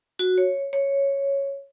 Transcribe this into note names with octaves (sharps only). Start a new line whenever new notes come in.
F#4
C#5
C#5